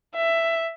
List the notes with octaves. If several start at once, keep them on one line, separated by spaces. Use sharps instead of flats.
E5